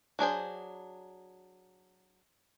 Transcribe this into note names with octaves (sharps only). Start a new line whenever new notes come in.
F#3 D4 G#4 C5